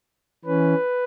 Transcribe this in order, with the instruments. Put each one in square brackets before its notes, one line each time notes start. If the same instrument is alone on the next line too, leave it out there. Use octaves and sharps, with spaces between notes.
[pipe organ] E3 C#4 B4